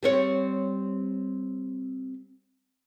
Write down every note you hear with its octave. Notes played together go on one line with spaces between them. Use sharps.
G3 C4 C#5